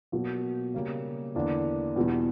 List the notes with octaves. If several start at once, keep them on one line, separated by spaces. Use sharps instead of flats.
B2 F#3 A#3
C#3 G3 A#3
E2 D3 A#3 D4
E2 B2 G3